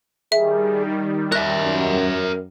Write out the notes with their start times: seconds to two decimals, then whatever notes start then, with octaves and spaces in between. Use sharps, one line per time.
0.32 D#3 G3 G#4 E5
0.87 D#4
1.32 A#4 E5 F#6
1.62 F#2